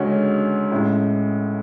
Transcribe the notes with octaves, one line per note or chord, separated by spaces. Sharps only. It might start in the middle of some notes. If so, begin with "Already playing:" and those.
Already playing: D2 C#3 G#3 C#4 F#4
A1 A2 G#3